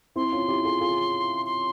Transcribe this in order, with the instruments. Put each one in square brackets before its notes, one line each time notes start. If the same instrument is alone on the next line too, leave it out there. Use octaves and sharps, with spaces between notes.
[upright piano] C4 E4 [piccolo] C6
[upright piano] C#4 F4
E4 G4
F4 G#4
F4 G#4
[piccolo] C6